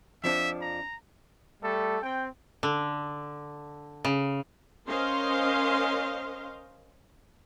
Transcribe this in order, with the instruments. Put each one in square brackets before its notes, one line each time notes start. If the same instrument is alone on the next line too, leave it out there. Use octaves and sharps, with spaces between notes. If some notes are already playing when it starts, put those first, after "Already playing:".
[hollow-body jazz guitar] F2 F3 D4 [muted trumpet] E5
[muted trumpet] A#5
[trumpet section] G3 A3 A4
C4 G5
[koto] D3
C#3
[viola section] C#4 A#4 C5 D#5 F5 C6